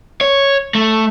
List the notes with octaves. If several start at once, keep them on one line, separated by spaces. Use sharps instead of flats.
C#5
A3